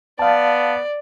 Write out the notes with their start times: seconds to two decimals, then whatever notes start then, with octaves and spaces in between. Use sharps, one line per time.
0.19 B3 D5 F5 A5